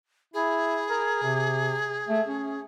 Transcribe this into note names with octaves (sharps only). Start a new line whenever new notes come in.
E4 G#4
A#4
C3
A3
C#4